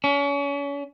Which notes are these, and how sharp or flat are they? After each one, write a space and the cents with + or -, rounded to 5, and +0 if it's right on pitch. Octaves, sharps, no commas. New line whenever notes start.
C#4 +35